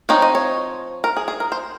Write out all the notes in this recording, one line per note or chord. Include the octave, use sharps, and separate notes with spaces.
F3 C4 D#4 C#5
D#5
C#5
A#4
G#4
G#4
A#4
C5